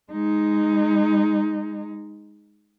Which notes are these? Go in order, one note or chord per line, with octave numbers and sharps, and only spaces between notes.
G#3 D#4